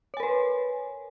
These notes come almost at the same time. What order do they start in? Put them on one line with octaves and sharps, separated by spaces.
C#5 G#5 A#4 B4